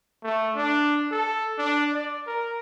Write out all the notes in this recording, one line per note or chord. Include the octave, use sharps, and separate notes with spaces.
A3
D4
A4
D4
D5
A#4